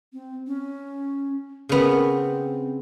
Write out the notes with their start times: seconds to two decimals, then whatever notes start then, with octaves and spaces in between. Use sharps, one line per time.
0.13 C4
0.47 C#4
1.69 C#3 B3 C4